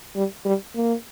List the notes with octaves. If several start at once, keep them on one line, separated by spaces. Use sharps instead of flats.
G3
G3
A#3